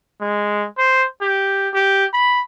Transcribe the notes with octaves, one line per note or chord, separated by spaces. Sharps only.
G#3
C5
G4
G4
B5